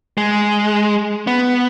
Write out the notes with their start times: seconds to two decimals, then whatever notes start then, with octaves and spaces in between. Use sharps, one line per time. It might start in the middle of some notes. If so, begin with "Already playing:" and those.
0.17 G#3
1.27 B3